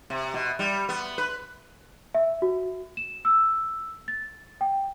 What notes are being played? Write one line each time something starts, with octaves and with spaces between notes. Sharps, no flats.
C3
B2
G3
B3
B4
E5
F#4
E7
E6
A6
G5